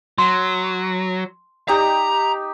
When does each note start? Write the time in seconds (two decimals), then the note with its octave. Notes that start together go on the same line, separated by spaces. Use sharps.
0.18 F#3 C6
1.68 D#4 G4 A#5